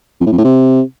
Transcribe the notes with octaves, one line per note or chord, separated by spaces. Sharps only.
F2
A2
F2
A2
C3